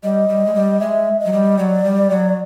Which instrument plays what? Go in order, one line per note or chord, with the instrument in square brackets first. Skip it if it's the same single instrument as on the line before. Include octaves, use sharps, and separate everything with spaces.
[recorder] G3 [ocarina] D#5
[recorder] G3
G#3
G3
[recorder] G#3 [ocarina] E5
[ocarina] D#5
[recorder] F#3
G3
[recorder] F#3 [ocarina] D5
[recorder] G3
F#3